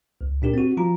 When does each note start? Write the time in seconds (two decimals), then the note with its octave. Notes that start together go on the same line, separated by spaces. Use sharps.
0.21 C#2
0.42 A#2 D4 G4 A#4
0.54 C4 F#4
0.77 F3 F4 A#5